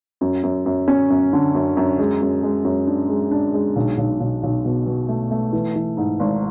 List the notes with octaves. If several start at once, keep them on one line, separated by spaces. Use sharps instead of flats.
F#2
F#2
F#2
C#4
F#2
D3
F#2
F#2
G#3
F#2
G#3
F#2
D4
G#3
D4
G#3
B1
B1
B1
B1
B2
B2
A3
A3
E3
E3
G#2
G#1